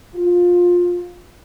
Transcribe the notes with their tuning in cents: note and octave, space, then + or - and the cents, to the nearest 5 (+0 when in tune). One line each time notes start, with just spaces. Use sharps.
F4 +20